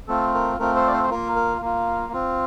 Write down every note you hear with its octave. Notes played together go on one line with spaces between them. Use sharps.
A3 C4 F4 A4
A#4
A3 C4 F4 A#4
A4 C5
D5
A4 C5
C5
A#3 F4 A#4
A#4
A#3 F4
C4 F4